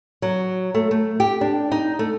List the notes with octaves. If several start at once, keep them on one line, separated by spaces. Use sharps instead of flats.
F#3
A3
A3
G4
D4
D#4
A3